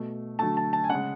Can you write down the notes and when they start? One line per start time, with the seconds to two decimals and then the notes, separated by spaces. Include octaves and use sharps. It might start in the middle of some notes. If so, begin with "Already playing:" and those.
Already playing: B2 A3
0.39 D3 F#3 A3 A5
0.57 A5
0.73 A5
0.84 G#5
0.90 C#3 G#3 F#5